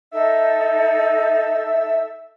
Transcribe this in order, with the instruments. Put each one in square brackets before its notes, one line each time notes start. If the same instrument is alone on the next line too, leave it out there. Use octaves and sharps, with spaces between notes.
[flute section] D#4 A4 [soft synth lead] E5